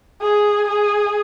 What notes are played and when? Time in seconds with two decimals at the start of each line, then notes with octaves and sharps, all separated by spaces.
0.21 G#4
0.68 G#4